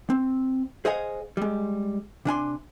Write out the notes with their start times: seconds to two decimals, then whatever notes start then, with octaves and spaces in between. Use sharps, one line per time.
0.10 C4
0.85 G#4 C5 D#5 F5 F#5 G#5
1.37 G3 G#3
2.25 C3 D4 G#5 C6